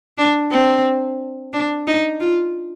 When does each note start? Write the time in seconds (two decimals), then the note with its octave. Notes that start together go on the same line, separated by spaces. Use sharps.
0.18 D4
0.51 C4
1.53 D4
1.87 D#4
2.20 F4